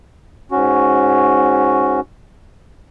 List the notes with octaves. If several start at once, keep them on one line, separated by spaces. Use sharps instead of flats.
G#2 C#4 F#4